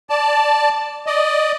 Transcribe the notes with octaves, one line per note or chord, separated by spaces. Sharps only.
D5 A5
D5 D#5